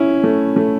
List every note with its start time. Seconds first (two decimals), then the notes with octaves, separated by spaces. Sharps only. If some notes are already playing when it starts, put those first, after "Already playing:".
Already playing: C#4 E4
0.24 A3
0.56 A3